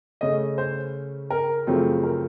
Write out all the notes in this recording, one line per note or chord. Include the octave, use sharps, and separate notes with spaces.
C#3 A3 C#4 D#5
C5
A#4
F#2 C#3 F3 A3 C4
A#4